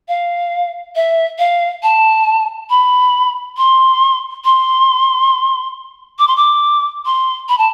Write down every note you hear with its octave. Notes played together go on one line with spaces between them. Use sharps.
F5
E5
F5
A5
B5
C6
C6
D6
C6
D6
C6
B5
A5